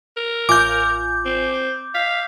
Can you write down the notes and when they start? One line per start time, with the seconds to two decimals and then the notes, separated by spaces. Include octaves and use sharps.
0.17 A#4
0.49 A1 F4 G#5 D6 G6
1.26 C4
1.95 F5 B6